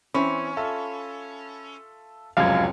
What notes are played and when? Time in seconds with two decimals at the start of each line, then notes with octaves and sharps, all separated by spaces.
0.14 E3 C4 C#4 E5 B5
0.57 F4 A4 E5
2.37 F1 C#2 F#2 A2 C#3 F3 F5 G#6